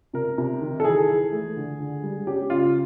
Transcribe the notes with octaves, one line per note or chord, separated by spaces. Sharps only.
C3 A#4
C3
D#3
A4
E3 G#4
E3
A3
D3
D3
G3
C#4 G4
C#3 F4